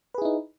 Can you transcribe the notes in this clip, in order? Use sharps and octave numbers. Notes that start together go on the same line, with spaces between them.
D#4 E4 G#4 B4